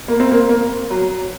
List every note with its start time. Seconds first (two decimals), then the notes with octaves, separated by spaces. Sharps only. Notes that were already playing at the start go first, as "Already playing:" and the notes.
0.08 A#3
0.20 C4
0.31 A#3
0.49 A#3
0.90 F#3